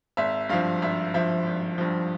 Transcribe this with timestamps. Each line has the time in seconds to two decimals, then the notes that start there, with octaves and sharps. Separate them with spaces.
0.17 G#1 E5
0.49 G2 F3 F5
0.82 G#1 E5
1.14 G2 F3 E5
1.47 G#1
1.78 G2 F3